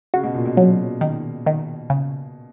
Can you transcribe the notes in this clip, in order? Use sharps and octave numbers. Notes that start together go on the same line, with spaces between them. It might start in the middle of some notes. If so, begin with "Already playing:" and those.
C#3 F#4
B2
A#2
B2
F#3
D#3
D#3
C#3